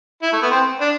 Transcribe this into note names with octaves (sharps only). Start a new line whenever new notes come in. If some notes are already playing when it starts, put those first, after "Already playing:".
E4
A3
B3
C4
D4